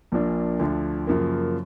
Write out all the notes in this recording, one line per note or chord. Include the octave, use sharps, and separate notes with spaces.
A#1 A#2 F3 A#3 D4
D2 D3 F3
F#2 C#3 F3 A#3